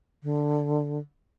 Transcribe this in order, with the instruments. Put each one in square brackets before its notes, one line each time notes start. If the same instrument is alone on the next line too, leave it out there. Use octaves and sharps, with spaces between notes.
[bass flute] D3